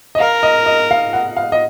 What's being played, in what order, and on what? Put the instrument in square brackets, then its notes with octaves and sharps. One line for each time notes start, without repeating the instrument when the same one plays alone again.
[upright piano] D#5
[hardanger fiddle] A#4 [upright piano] F5
[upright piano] D#5
D#5
F5
F#5
F5
D#5